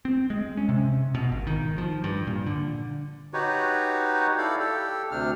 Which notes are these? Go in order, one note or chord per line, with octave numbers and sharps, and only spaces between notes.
C4
G#3
C#4
C3
B2
G#1
D#3
F3
G2
A#2
D3
D#4 F#4 G4 B4 C#5
E4 A4 D5 F5
G4 A4
D2 C3 D4 F6